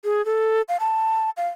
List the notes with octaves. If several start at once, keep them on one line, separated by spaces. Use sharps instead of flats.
G#4
A4
F5
A5
F5